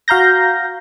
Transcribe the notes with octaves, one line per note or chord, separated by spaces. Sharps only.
F#4 F5 A#5 G6 A#6